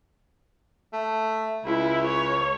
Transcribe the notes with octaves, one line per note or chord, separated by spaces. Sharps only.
A3
C#2 E4
C#5